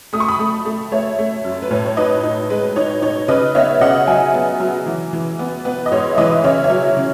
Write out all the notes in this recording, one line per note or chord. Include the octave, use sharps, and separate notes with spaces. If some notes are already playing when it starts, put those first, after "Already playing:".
A3 D#6
C#6
B5 D#6
A3
A3
A3 C#5 E5
A3
F#2
B4
A2 C#5
C#5
D#4 B4 D#5
D#4
G#3 B4
D#4 C#5
D#4 C#5
C#3 B4 D#5
B3 C#5 E5
C#3 D#5 F#5
F#3 E5 G#5
B3
F#3
E3
E3
B3
B3 B4
D#5
G#2 C#5
E5
E3 B4 D#5
C#3 C#5 E5
C#5 E5
F#3
C#3